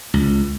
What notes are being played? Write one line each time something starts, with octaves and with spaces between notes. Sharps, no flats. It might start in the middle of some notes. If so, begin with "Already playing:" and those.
C#2